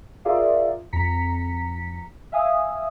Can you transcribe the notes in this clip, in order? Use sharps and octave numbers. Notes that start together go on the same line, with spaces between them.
F4 G#4 A#4 D5 E5 F5
F2 A#5 B6 C#7
E5 F5 G#5 D#6